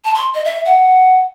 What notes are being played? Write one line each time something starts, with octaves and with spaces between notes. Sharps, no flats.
A5
C6
D#5
E5
F#5